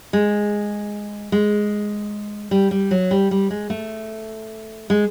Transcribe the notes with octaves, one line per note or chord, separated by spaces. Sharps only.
G#3
G#3
G3
G3
F#3
G3
G3
G#3
A3
G#3